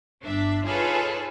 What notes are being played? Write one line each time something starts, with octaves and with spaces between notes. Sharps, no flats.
G1 D4 E5
D#4 F4 G#4 A4 B4 C#5